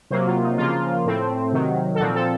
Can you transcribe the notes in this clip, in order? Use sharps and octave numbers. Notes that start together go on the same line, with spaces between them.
C3 F#3 A#3 C5
F4
D#4
C#3 F3 A#3 F4
A2 A3 C4
C3 D#3 F#3
A4
A#2 F3 C4 F#4
A4